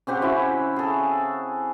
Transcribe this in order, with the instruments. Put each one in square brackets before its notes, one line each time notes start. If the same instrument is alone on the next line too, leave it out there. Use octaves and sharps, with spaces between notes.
[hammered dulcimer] C#3 C4 G4 F#5
E4 F#4
G#4 A4